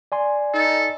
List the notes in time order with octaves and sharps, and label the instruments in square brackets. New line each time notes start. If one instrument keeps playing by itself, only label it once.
[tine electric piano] D5 G#5 C6
[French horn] D#4 [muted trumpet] A4